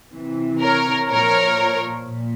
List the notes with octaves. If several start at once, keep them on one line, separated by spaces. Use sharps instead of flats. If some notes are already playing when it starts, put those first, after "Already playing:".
C3 E3
A#4 C#5
A#2 F3 A#4 C#5
A#2